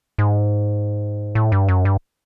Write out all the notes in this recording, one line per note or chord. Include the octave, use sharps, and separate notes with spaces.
G#2
A2
G2
F#2
G2